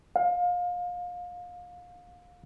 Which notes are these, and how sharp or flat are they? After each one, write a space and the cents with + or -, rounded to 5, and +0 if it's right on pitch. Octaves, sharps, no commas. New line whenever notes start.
F5 +30